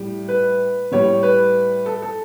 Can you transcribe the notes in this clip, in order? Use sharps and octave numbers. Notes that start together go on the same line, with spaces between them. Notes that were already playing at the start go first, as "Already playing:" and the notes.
Already playing: A2 G3
B4
A2 G3 C#5
B4
A4
A4